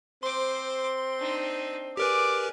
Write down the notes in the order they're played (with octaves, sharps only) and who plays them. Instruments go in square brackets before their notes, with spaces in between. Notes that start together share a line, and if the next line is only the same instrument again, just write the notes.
[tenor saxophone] C4 [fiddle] C5 D6 [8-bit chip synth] C6
[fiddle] D4 D#4
[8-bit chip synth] G4 A#4 B4 [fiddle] G#4 D5 [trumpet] D6